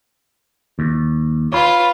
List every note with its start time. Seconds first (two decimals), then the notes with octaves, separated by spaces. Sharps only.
0.79 D#2
1.53 F4 B4 C#5 B5